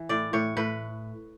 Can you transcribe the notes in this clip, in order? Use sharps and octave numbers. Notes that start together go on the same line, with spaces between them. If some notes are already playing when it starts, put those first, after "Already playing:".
Already playing: E3
A2 D5
A2 C#5
A2 B4